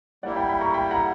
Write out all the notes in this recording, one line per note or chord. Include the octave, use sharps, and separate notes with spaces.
G3 A#3 E4 D5 F#5
G5 B5
G5 B5
A#5 C#6
G5 B5
F#5 A#5